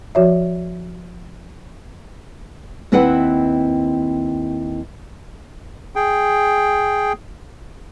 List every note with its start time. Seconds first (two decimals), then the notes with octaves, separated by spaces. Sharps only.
0.15 F3 F#4 C#5 E5
2.92 D#2 C4 E4 B4 D#5 F#5
5.96 G#4 G5